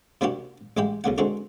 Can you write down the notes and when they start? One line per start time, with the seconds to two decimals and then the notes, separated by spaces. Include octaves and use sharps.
0.21 C3 A#3 D4 E4 F#4 G4
0.77 A1 G#3 E4 G4 G5
1.04 B1 C#3 A#3 F#5
1.18 D3 G#3 C4 F#4 A#4